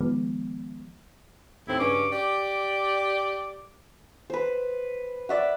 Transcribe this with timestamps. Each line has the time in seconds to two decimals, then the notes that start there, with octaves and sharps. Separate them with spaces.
0.01 D#3 F3 G#3 B3
1.68 D#2 A2 C4 E4
1.79 G2 C#3 C#4 D6
2.13 G4 D5
4.30 B4 C5
5.29 D5 E5 F#5